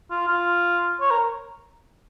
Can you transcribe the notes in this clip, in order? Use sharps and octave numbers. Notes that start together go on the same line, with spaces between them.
F4
F4
C#5
A#4